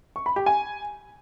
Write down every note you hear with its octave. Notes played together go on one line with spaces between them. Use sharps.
C#6
B5
G4
G#5